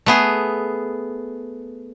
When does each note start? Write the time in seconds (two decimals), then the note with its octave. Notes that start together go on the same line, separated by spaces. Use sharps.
0.06 A3 B3 G#4